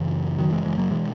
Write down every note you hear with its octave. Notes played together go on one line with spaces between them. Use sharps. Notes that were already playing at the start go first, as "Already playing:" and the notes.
Already playing: F#2 C#3 E3
D#3 F#3
E3 G#3
E3 G#3
F#3 A#3
B2 E3 G#3